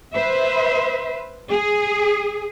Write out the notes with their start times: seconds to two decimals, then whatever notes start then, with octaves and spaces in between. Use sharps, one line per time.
0.14 B4 C5 E5
1.50 G#4